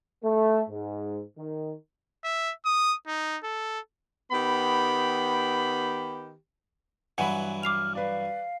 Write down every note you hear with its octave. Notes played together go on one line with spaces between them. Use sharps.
A3
G#2
D#3
E5
D#6
D#4
A4
D#3 B3 G4 B5
G2 E3 F#3 F#5 G#5 B5
D6 F6 C7 F7
B4 D5 F5